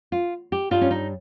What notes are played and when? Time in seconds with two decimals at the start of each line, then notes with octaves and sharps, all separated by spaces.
0.12 F4
0.52 G4
0.71 G2 G3 F4
0.81 C#4
0.91 D#4